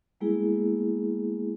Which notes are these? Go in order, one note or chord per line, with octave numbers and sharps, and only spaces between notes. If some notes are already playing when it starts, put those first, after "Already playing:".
G3 G#3 A#3 B3 E4 G#4